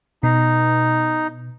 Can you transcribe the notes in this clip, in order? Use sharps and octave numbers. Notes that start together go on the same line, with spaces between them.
B2 D#4